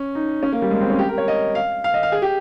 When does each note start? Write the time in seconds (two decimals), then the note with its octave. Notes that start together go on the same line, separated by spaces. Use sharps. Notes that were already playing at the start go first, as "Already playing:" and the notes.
Already playing: C#4
0.15 D#4
0.43 C#4
0.52 A#3
0.62 G3
0.71 G#3
0.81 C4
0.90 C#4
0.99 G4
1.09 A#4
1.18 C#5
1.28 D#5
1.55 F5
1.84 F5
1.94 D#5
2.03 F5
2.12 G#4
2.22 G4